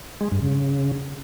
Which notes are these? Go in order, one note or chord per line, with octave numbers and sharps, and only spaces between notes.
G#3
G2
C#3